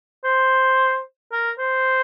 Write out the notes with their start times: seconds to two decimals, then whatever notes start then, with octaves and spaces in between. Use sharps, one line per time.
0.24 C5
1.32 A#4
1.59 C5